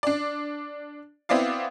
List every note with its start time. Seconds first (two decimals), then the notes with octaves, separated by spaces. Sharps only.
0.03 D4 D5
1.29 B3 C4 E4 D5 F5